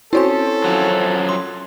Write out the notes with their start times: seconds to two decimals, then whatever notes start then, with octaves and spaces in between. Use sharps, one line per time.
0.13 C4 C#4 E4 F#4 A4 C5 G#5
0.64 F#2 F3 F#3
1.29 C6